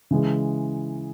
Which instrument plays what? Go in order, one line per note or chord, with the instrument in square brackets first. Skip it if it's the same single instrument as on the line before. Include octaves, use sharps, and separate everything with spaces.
[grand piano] C#3 E3 G#3